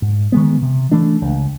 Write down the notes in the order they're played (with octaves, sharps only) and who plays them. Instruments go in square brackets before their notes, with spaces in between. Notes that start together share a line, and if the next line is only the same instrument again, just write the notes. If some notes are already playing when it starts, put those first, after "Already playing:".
[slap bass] G#2
D#3 G#3 B3
C3
E3 A3 D4
C#2